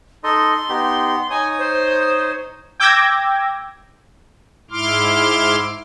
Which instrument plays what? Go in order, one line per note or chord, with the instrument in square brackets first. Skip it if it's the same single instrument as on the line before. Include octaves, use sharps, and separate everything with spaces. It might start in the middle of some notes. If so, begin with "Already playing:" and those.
[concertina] D#4 A4 D#5 [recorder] C6
[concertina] B3 D#4 G4
[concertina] D#4 C#5 D#6 [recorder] G#5
[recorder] C5
[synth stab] G5 D6 E6 G6 G#6 A#6
[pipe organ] G#2 E4 C6 D6 F6